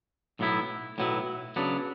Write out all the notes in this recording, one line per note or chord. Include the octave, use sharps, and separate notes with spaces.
B1 A2 F#3 B3 E4
B1 A2 F#3 B3 E4
C#3 F#3 B3 D4